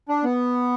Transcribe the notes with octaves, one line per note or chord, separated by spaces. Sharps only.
D4
B3